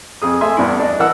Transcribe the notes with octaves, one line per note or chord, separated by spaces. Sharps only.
F2 G#4 D#6
A3 E5 G#5 C6
E2 G2 E4
D4 D#5
E3 A#4 F#5 E6